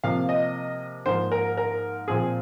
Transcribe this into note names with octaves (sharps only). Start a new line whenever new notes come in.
C3 F3 A#3 F5
D#5
G#2 F3 A#3 C5
A#4
A#4
A#2 F3 C4 G#4